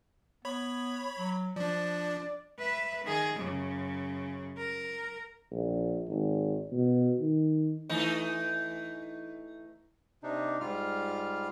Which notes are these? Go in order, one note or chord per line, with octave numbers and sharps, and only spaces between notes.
B3 C#5 B5
F#3
F3 D4 D5
B4 E5
D#3 G#4
F#2 C#3
A#4
A#1
G#1
B2
D#3
E3 A3 D#4
C3 D4 D#4
G#2 G3 F4 F6